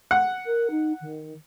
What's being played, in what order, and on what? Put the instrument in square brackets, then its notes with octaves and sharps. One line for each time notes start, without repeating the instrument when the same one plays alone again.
[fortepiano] F#5
[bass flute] A#4
D#4
D#3